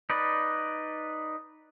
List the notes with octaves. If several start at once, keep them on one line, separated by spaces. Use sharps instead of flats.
D#4 B4 D5